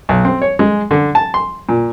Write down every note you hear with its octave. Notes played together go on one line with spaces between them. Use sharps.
B1
C4
C#5
G#3
D3
A5
C6
A#2